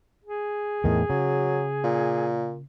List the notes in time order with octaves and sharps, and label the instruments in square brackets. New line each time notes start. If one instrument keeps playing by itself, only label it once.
[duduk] G#4
[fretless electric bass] E2 A2 [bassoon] D#3
[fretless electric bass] C#3 [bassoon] F#3
[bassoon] A#2